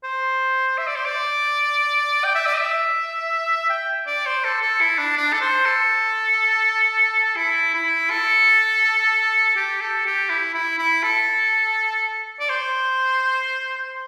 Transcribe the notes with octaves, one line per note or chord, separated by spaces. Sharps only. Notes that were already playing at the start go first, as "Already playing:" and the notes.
C5
E5
D5
C5
D5
G5
E5
D5
E5
G5
D5
C5
A4
A4
E4
D4
D4
A4
C5
A4
E4
E4
A4
G4
A4
G4
E4
E4
E4
A4
D5
C5